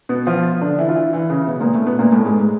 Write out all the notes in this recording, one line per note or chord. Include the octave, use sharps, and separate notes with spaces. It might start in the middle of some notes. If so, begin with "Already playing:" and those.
B2 B3
F3 F4
D3 D4
E3 E4
F4
E3 E4
E3 E4
C#3 C#4
B2 B3
A#2 A#3
A2 A3
B2 B3
A#2 A#3
A2 A3
G#2 G#3